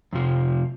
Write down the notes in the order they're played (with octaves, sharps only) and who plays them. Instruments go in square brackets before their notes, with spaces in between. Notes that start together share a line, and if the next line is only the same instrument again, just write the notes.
[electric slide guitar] F2 C3 F3